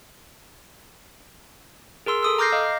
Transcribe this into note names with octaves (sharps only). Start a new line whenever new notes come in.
G#4 A#4 C6 E6
A4 D#6 E6
A#5 D6 F6 G6 A#6 C7
D#5 F5